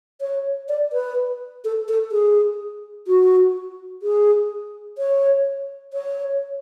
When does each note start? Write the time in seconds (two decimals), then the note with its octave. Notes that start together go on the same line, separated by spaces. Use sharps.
0.21 C#5
0.69 D5
0.93 B4
1.65 A4
1.88 A4
2.12 G#4
3.08 F#4
4.03 G#4
4.98 C#5
5.93 C#5